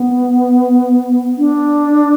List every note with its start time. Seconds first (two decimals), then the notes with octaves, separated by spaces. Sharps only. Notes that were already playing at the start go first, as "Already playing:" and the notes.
Already playing: B3
1.38 D4